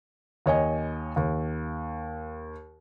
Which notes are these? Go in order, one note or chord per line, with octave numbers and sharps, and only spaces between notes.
D#2 C#5 D#5 G#5
D#2